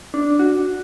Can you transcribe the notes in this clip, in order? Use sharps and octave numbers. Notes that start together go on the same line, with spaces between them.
D4
F#4